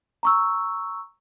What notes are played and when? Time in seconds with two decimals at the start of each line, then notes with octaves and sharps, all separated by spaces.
0.23 A#5 C#6 E6